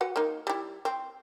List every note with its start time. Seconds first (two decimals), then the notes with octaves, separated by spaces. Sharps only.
0.01 F#4 B4 F#5
0.16 A#3 D#4
0.47 G3 E4
0.85 C4